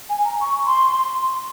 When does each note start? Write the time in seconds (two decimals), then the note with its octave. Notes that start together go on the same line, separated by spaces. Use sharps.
0.09 G#5
0.25 A#5
0.41 C#6
0.66 C6